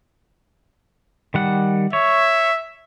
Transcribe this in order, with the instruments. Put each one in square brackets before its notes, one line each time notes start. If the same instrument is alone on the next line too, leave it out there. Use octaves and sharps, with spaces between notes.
[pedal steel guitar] D#3 G3 F#5
[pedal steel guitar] C#5 [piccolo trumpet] E5